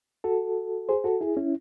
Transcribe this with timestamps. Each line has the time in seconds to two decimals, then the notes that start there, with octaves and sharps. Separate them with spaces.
0.24 F#4 A4
0.89 G#4 C5
1.04 F#4 A4
1.21 E4 G#4
1.37 C#4 E4